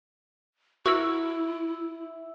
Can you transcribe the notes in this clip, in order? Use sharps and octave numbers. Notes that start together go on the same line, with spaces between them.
E4 F#4 A#4 E5 C#6 E6